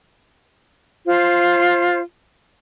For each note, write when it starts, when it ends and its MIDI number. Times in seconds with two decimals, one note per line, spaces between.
1.07 2.01 65
1.07 2.01 72